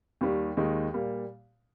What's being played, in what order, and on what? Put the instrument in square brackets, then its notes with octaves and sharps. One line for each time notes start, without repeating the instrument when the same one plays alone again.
[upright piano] D#2 D#3 G3
D#2 D#3 G#3 D#4
A#2 G3 A#3